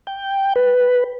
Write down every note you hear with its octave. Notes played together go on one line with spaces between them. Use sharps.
G5
B4